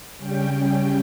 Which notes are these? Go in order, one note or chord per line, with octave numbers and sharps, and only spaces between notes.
C#3 G3 C#4 G5